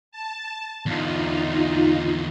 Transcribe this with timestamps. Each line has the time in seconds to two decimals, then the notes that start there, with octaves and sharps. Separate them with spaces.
0.12 A5
0.86 E2 D3 D#4 F4